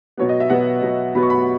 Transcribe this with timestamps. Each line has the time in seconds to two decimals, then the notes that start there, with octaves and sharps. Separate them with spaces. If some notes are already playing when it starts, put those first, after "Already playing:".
0.17 B2 F#3 B3 C#5
0.29 D#5
0.40 E5
0.50 B2 F#3 B3 F#5
0.82 B2 F#3 B3
1.15 B2 F#3 B3 B5
1.23 C#6
1.30 B5